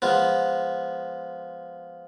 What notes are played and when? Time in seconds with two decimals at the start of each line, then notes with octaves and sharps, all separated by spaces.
0.02 F3 G#3 B3